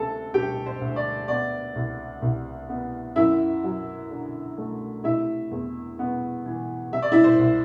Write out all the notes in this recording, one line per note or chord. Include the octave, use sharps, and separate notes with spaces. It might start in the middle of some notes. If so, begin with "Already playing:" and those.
Already playing: D2 C3 A4 A5
D2 G4 G5
C5
D2
D5
B3 D5
C2
C2
B3
F#2 E4 E5
F#3
D3
A3
C3 E4 E5
E2
B3
E3
C3 E5
D5
E4 E5
C5
C2